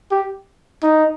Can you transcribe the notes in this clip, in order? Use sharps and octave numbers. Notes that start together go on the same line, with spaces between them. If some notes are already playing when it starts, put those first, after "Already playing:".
G4
D#4